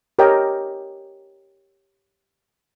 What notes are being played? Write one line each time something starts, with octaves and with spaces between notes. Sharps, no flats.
G4 A#4 C#5 D#5 G5